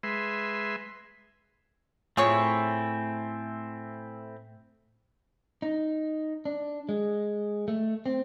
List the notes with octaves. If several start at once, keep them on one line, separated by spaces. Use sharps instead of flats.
G#3 B4 E5 C6
A2 A3 C4 E4 F4 G#4 C#5 G#5
D#4
D4
G#3
A3
C4